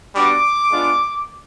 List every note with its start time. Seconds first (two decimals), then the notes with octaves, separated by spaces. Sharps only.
0.15 G3 B3 D4 F#4 D6
0.71 G#3 B3 D4 F4